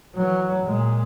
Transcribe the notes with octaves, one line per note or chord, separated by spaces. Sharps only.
E3 F#3
A#2 G#3